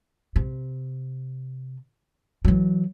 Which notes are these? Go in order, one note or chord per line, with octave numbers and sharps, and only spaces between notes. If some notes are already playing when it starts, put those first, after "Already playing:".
C3
E3 F#3